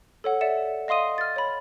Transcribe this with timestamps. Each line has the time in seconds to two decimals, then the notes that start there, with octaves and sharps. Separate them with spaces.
0.24 A4 C#5 F#5
0.41 D5 E5 C#7 E7
0.88 D#5 F5 C6 D#6 D#7
1.18 F6 A6
1.36 C#5 B5